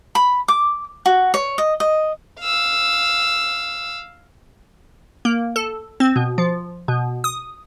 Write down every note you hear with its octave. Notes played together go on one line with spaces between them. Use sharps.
B5
D6
F#4
C#5
D#5
D#5
F5 E6
A#3
A4
C4
B2
F3
B2
D#6